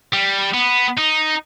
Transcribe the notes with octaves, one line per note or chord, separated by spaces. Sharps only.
G3
B3
D#4